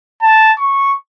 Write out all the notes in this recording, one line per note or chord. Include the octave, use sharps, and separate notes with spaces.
A5
C#6